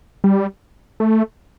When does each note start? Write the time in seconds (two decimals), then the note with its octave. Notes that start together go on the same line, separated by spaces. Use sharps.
0.24 G3
1.00 A3